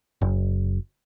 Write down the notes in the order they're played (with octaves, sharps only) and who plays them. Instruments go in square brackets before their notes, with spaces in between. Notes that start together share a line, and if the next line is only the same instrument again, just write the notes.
[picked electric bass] F#1